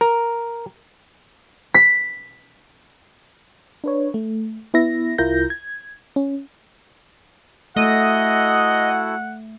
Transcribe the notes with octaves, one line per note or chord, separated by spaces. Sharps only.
A#4
B6
D4 B4 C#5
A3
B3 E4 E5 A#6
C2 E4 F4 A#4 G6 A#6
G#6
C#4
A3 E4 F#4 A4 D#5 F#5